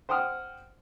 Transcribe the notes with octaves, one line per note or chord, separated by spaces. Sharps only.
C5 F#5 G5 D#6 F6